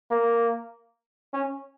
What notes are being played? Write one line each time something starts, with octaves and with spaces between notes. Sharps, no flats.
A#3
C#4